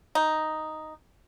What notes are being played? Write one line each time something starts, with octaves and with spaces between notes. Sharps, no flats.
D#4